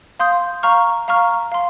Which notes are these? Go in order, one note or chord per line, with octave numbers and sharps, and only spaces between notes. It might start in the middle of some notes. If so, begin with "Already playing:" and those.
F5 C6 D#6 G6
F5 A#5 C#6 F6
F5 A#5 C#6 F6
F5 C6